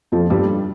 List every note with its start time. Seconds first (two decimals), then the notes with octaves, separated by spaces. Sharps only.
0.12 F2 F3
0.30 G2 G3